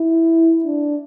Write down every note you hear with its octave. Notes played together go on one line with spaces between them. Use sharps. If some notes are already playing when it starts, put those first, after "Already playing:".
Already playing: E4
D4